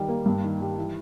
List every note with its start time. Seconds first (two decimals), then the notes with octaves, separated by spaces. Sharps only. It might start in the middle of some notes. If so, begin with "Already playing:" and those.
Already playing: D#3 G3
0.09 A#3
0.26 G2
0.43 D#3
0.60 G3
0.78 E3